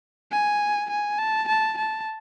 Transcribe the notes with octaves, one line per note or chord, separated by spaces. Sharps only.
G#5
G#5
A5
A5
A5